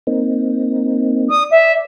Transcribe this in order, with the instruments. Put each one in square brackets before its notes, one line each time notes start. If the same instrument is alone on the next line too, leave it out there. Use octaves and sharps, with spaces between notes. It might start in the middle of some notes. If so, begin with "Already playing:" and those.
[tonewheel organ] A#3 C4 D#4
[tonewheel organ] D5 [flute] D#6
[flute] E5